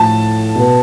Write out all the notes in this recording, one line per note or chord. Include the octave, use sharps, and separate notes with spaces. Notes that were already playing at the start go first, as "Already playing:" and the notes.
Already playing: A2 F3 A5
B2 B3